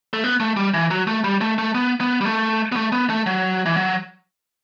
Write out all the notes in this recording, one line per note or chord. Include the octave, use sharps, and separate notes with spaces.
A3
B3
A3
G3
E3
F#3
A3
G3
A3
A3
B3
B3
G3
A3
B3
A3
B3
A3
F#3
E3
F#3